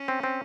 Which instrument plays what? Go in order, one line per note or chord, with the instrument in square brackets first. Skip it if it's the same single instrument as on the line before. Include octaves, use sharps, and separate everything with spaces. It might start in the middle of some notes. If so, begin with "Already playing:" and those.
Already playing: [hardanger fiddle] C#4
[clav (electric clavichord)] C4
C4